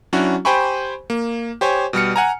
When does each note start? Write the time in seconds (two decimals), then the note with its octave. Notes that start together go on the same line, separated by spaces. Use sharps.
0.13 F#3 C#4 D4 E4 F#4
0.45 G4 C5 G5 G#5 B5 C#6
1.10 A#3
1.61 G4 C5 C#5 G#5
1.93 B2 G3 F6 C#7
2.16 F#5 G#5 A#5